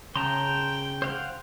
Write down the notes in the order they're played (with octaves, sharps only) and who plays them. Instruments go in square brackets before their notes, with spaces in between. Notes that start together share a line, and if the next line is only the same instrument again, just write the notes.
[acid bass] C#3 [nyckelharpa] G5 [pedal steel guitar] A5 A#5 C6
[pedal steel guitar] C5 F5 F#5